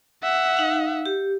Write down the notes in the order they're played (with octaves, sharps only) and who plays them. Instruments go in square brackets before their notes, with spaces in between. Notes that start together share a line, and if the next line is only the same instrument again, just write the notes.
[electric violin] E5 F#5
[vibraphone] D#4 F5
G4